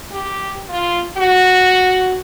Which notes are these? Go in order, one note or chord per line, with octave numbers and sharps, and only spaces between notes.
G4
F4
F#4